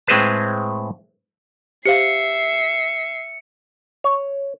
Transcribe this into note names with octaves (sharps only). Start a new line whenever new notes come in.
A2 G#3 C4 G#4 B4 A5
G4 C5 E5 F5 C7 C#7
C#5